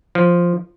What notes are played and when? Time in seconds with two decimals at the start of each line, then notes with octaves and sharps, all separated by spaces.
0.15 F3